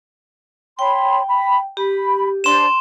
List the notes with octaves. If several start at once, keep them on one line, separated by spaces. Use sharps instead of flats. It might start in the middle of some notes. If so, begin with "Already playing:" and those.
C#5 G5 B5 C6
B5
G4 B5
D4 C5 C6 E7